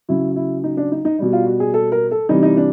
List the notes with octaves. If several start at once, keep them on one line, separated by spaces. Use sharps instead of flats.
C#3 F#3 E4
E4
D#4
D4
D#4
D#4
B2 G3
F4
F#4
G#4
A4
A#4
A4
C3 E3 G3 D#4
D#4
D4